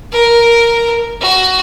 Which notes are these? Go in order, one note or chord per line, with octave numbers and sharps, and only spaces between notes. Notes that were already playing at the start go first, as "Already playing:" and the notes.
A#4
F#4